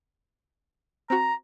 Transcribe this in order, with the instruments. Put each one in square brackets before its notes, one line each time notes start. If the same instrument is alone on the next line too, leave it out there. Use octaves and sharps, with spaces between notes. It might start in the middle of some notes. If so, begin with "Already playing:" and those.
[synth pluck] C4 F#4 [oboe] A#5